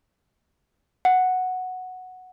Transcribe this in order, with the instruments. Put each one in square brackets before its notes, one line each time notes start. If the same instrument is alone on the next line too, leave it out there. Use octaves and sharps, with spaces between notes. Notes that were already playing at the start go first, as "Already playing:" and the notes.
[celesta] F#5